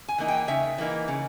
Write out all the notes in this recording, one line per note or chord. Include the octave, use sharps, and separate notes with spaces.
G#5
E3 A#3 D#4
G5
C#3 E5
E3 A#3 D#4
C#3